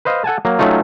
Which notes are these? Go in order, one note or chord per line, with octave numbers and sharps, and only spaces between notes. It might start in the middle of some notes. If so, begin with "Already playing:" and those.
B4 C5 D#5 F5
A4 F#5 G#5 A5
F#3 A#3
F#3 A3 C#4 D#4 F4